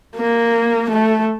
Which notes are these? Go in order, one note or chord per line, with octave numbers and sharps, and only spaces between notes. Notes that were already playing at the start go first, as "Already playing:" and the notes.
A#3
A3